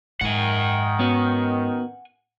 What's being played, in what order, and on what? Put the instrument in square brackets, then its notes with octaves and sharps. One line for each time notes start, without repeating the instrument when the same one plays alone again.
[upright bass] G#2 [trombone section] D#3 [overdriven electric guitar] F#5 G#5
[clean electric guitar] B3 C#4 F#4